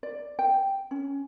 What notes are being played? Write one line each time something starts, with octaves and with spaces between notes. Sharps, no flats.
D5
G5
C#4